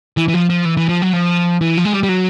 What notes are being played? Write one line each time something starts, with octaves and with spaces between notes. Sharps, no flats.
E3
E3
F3
F3
E3
E3
F3
F#3
F3
E3
F3
G#3
G3
G3
F#3